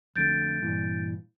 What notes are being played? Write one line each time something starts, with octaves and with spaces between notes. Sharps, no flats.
F2 D3 A3 G6 A6 D7
G2 A#2 E3